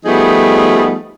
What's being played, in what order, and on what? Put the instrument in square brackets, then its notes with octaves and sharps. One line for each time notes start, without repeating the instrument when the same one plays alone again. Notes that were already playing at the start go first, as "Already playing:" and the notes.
[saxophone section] F3 G3 A3 B3 D#4 G#4